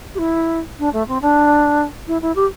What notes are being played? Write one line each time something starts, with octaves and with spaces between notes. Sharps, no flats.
G4
E4
D4
A3
C4
D4
E4
E4
G4